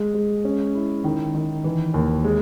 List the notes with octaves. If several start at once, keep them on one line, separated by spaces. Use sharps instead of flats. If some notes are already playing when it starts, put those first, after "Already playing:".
Already playing: G#3
G#3
C#4
E4
D#3
D#3
E3
D#2
G#3